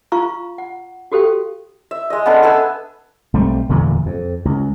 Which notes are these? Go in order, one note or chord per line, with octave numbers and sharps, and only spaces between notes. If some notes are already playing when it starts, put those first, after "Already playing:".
F4 F5 A#5 C#6
F#5
F#4 G4 A4 C5 F5 G5
E5
G#3 D#5
B3 C#4 D4 A4
A4 B4 E5 G#5
B1 G3 A3 C4
F1 E2 A#2 D3
F2
C#2